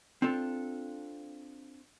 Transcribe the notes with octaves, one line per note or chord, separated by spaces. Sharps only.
C4 D4 F4 A4